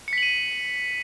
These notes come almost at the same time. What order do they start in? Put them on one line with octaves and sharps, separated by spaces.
C#7 B6 F#7 D#7